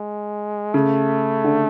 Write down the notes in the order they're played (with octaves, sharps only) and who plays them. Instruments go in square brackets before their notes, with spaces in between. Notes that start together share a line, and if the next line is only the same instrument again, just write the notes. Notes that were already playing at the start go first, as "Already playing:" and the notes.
Already playing: [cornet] G#3
[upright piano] C#3 [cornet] A3
[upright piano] D3